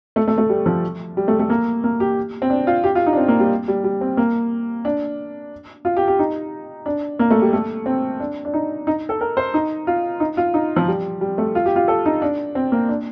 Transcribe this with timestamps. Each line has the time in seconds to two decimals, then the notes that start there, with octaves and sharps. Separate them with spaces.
0.16 A3
0.28 A3
0.38 A3
0.49 G3
0.66 F3
1.17 G3
1.28 A3
1.39 A3
1.50 A#3
1.84 A#3
2.00 G4
2.42 C4
2.50 D4
2.67 F4
2.84 G4
2.95 F4
3.07 D#4
3.13 D4
3.17 C4
3.28 A#3
3.40 G3
3.68 G3
3.84 G3
4.01 C4
4.17 A#3
4.85 D4
5.85 F4
5.97 G4
6.08 G4
6.19 D#4
6.86 D4
7.19 A#3
7.31 A3
7.42 G3
7.53 A3
7.86 C4
8.20 D4
8.45 D4
8.54 D#4
8.87 D#4
9.09 A4
9.21 A#4
9.37 C5
9.54 D#4
9.87 F4
10.20 D#4
10.37 F4
10.54 D#4
10.76 F3
10.88 G3
11.21 G3
11.38 A3
11.55 F4
11.66 G4
11.76 F4
11.88 A4
12.06 D#4
12.22 D4
12.55 C4
12.72 A#3
12.89 D4